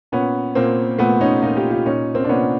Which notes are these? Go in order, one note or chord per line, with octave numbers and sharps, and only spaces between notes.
A#2 B3 C#4
A#2 A#3 C4
A#2 A3 B3
C#4 D#4
A#2 D#4 F4
F4 G4
F4 G4
A#2 C#4 D#4
A#3 C4
D4
A#2 B3 C#4